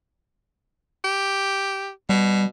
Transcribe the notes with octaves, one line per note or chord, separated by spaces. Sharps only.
G4
B2 G3